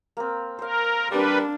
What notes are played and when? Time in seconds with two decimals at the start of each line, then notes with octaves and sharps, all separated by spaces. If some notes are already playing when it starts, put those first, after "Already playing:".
0.17 A#3 C4
0.59 A#4 C5 F5
1.12 G3 D4 A#4 B4